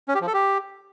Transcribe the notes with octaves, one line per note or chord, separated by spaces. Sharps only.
C#4
G4
F3
A4
G4